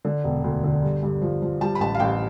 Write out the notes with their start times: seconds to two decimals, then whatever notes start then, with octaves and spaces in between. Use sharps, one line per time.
0.05 D3
0.24 E1
0.44 D2
0.64 D3
0.83 G2
1.03 G2
1.22 F3
1.42 F3
1.61 G3 A5
1.75 B5
1.80 A1 A5
1.94 F5
2.00 A1 G5